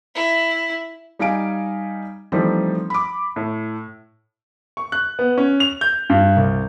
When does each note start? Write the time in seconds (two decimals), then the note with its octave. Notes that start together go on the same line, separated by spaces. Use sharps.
0.15 E4
1.19 G3 D#4 F5 G#5 D7
2.32 E3 F3 G3 A3 C4 D#4
2.90 B5 D6
3.36 A2
4.77 C#6
4.92 F#6
5.19 B3
5.38 C#4
5.60 F7
5.81 G6
6.10 G2
6.36 C2